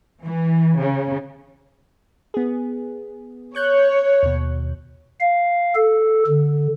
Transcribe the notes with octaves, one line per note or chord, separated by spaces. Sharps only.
E3
C#3
B3 G#4
C#5 C#6 F#6 G6
D#2 B2
F5
A4
D3